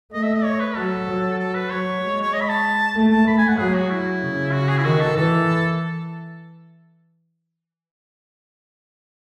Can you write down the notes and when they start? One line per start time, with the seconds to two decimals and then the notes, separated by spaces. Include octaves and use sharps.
0.12 A3 D#5
0.23 E5
0.34 D#5
0.44 C#5
0.60 B4
0.76 F#3 A4
1.07 F#3
1.39 A4
1.54 B4
1.70 F#3 C#5
2.02 G#3
2.21 C#5
2.33 D#5
2.41 B5
2.49 A5
2.96 A3
3.12 A5
3.27 A3 B5
3.38 G#5
3.48 F#5
3.59 F#3 G#4
3.74 F#4
3.90 E4
4.22 C#3
4.53 F#4
4.69 G#4
4.77 E4
4.84 D#3 F#4
5.00 A4
5.16 E3 A4